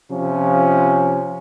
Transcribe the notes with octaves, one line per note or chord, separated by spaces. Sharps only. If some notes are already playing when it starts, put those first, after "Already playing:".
C3 F3 C#4